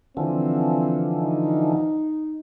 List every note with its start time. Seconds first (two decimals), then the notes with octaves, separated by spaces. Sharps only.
0.17 D3 E3 F3 C4
1.16 D#4